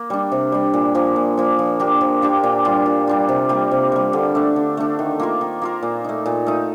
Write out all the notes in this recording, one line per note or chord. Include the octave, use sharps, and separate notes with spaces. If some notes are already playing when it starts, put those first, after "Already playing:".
Already playing: A#3
G3 D4
C3
G3 D4
A#2
F3 A#3
A#2
F3 A#3
F3
A#3 D4 G4
F3
A#3 D4 G4
A#2
G3 D4 F4
A#2
G3 D4 F4
C3
G3 A#3
C3
G3 A#3
D3
A3 D4
D3
A3 D4
D#3
A#3 F4 A#4
D#3
A#3 F4 A#4
A#2
A3 D#4
A#2
A3 D#4